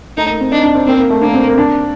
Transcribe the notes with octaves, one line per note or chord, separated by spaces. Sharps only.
A3 D#4
A#3
C4
D4 D#4
D4
C4
A#3 C4
A#3
A3
A#3 D4
C4
A#3
D4